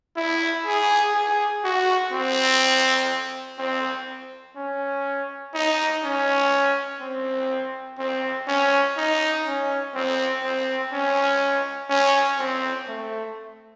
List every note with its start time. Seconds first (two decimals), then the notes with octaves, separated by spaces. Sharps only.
0.16 E4
0.66 G#4
1.14 G#4
1.64 F#4
2.12 C4
3.59 C4
4.57 C#4
5.55 D#4
6.04 C#4
7.01 C4
7.99 C4
8.48 C#4
8.97 D#4
9.45 C#4
9.95 C4
10.44 C4
10.93 C#4
11.90 C#4
12.39 C4
12.88 A3